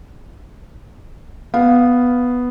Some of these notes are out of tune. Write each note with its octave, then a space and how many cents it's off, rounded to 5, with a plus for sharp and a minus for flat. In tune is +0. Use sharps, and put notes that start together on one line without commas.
B3 +0 F5 +5